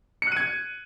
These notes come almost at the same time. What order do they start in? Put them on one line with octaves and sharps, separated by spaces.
C#7 F#6 D#7 G#6